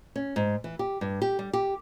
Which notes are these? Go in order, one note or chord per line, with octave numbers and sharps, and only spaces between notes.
C#4
G#2
E3
G4
G2
G4
G3
G4